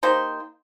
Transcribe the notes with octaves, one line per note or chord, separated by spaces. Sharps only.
A#3 D#4 G4 C5